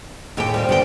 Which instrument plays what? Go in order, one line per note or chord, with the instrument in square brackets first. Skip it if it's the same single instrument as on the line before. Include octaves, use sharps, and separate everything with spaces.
[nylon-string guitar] D#2 G5 [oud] A2 G#3 G4
[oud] G3 C4 F4
[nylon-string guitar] D3 B3 G5